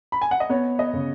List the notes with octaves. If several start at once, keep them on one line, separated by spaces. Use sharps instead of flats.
B5
G#5
F#5
D#5
B3 C#5
D#5
C#3